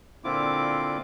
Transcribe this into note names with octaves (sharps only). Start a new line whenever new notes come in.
A#2 D3 C4 E4 F4 D6